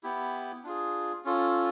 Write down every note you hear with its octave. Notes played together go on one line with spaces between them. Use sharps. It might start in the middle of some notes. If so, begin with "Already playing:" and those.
B3 E4 G4
D4 F4 G#4
C#4 F4 A4